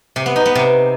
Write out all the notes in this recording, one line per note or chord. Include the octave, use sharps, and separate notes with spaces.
C3
B3
D#4
B3
C3